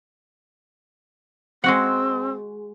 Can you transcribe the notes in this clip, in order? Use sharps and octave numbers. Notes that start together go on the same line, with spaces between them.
G#3 C4 F#4 F#5